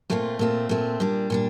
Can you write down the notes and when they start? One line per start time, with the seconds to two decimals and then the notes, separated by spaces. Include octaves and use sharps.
0.10 A#2 A3 C4 F4
0.39 A#2 A3 C4 F4
0.69 A#2 A3 C4 F4
1.00 A#2 G3 D4
1.30 A#2 G3 D4